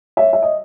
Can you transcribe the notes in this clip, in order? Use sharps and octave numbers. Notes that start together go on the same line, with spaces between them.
C#5 E5
E5
D#5